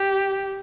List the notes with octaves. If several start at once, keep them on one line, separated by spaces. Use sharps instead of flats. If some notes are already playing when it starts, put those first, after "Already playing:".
Already playing: G4